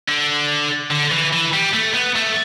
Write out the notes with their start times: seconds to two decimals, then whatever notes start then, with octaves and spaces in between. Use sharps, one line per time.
0.08 D3
0.91 D3
1.12 E3
1.33 E3
1.53 G3
1.74 A3
1.94 B3
2.16 A3